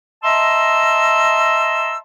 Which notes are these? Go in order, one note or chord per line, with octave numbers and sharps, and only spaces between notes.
D#5 E5 A5 A#5 C6 E6